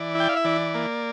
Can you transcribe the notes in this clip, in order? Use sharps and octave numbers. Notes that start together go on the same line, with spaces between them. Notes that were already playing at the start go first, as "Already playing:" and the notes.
Already playing: E3 D5
E4 G5
F5
E5
E3 D5
A#3